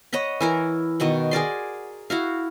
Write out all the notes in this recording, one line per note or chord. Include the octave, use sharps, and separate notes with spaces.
C#5 D#5 F#5 B5
E3 E4 A#4
B2 D#3 F#4 F#5
G#4 A#4 D5 C6
E4 F#4 F5